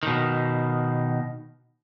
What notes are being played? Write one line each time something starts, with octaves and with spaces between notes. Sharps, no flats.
B2 D#3